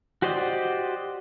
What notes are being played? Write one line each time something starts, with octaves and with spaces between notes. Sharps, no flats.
F#4 G4 C5 D5 D#5